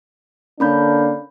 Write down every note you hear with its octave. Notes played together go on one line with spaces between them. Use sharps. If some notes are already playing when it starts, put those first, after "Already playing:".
D3 A#3 C#4 D4 B5 G6